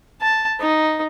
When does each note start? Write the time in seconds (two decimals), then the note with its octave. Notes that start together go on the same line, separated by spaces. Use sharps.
0.21 A5
0.59 D#4